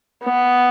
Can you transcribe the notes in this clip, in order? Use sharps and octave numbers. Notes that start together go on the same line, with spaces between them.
B3